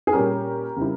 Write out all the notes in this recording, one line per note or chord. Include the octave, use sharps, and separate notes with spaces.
G#4
A#2 G3 C#4 G4 A#4
C#3 G3 C4 E4